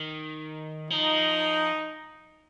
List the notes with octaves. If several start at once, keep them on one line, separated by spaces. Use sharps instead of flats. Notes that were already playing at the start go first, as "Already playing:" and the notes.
Already playing: D#3
F3 D#4